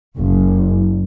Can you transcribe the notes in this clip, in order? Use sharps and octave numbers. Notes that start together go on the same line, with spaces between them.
F#1